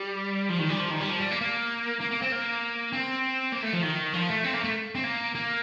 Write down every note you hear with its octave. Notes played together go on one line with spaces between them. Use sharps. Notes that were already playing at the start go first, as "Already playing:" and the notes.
Already playing: G3
F3
D#3
G3
F3
D#3
G3
F3
G3
A#3
A#3
A#3
A#3
C4
A#3
C4
A#3
A3
F3
D#3
F3
A3
C4
A#3
A3
C4
A#3
A#3